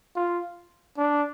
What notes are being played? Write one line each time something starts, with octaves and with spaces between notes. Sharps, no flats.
F4
D4